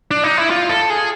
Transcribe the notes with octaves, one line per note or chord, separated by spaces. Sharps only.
D4
D#4
E4
F4
A4
G#4